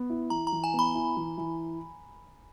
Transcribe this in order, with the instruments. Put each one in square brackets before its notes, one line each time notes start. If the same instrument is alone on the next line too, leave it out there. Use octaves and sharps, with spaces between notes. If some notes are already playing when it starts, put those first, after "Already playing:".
Already playing: [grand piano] B3
E4
[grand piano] E3 [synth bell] A#5
[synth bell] A#5
[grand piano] E3
[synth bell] G#5
[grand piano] B3 [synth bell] B5
[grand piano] E4
E3
E3